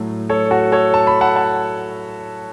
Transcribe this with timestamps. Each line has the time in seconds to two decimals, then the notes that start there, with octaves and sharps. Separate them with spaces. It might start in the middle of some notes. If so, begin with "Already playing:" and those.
Already playing: A2 F#3 A3
0.29 A4 C#5
0.51 F#4 A4
0.72 A4 C#5
0.94 A5
1.07 B5
1.21 F#5 A5
1.36 F#5 A5